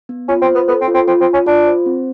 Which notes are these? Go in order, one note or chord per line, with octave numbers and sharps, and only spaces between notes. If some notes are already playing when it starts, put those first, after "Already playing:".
B3
C#4 F4
C4
C5
B3
B3 A4
C4
F4
C4
C4 F4
C4
F4
C#4
D4 F4
C5
C4